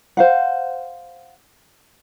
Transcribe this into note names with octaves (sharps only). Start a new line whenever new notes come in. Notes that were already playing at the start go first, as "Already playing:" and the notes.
C5 F5 F#5